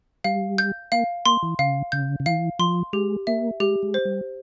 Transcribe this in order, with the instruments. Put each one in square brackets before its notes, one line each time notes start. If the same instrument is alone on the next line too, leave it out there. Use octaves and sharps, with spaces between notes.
[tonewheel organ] G3 [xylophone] F5
[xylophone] G6
[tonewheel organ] A#3 [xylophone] F5
[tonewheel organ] A#3 [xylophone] C6
[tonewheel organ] E3
[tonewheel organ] C#3 [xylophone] F5
[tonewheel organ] C#3 [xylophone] G6
[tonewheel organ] C#3
[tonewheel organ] E3 [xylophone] F5
[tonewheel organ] F3 [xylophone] C6
[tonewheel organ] G#3 [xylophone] G4
[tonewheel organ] A#3 [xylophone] E5
[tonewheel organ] G#3 [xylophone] G4
[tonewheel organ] G#3
[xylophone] C5
[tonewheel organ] G3